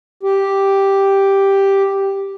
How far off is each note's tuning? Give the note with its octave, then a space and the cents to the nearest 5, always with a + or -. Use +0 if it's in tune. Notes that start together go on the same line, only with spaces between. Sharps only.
G4 +0